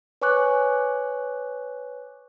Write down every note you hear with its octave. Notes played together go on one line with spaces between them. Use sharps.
B4 C#5 G#5 C#6 D6 F#6